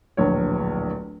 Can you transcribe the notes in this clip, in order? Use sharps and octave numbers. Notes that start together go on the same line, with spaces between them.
D1 A#1 C#5